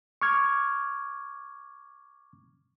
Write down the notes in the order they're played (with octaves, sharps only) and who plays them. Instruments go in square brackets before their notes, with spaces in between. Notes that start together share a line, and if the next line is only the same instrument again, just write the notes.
[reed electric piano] C#6 D6 F6 G#6